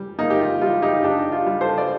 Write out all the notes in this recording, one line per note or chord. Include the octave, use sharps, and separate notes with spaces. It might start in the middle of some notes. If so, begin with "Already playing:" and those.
Already playing: G3
A#3 D#4
G4
F4
G3 F4
D#4 G4
D4 D#4 G4
F4
G3
A4 C5
D5